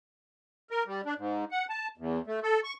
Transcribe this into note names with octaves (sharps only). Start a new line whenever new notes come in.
A#4
G3
D4
G#2
F#5
A5
E2
A3
A4
C#6